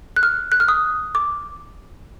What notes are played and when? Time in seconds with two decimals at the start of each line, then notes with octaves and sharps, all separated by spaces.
0.16 F#6
0.23 F6
0.52 F#6
0.60 F6
0.68 D#6
1.15 D6